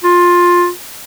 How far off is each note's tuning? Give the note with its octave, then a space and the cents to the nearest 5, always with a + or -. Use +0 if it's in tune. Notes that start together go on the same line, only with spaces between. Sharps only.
F4 +15